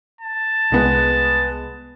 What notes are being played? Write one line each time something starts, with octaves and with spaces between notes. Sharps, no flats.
A5
C2 G#3 B3